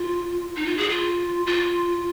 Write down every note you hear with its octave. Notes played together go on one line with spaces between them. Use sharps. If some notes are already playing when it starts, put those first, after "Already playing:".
Already playing: F4
D#4
F4
G#4
F4
F4